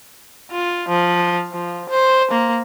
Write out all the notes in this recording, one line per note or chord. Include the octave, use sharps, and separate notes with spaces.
F4
F3
F3
C5
A#3